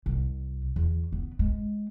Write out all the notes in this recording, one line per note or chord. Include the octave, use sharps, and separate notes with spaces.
C2
E2
B3
G#3